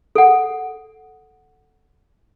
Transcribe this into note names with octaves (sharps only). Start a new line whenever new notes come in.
A4 F#5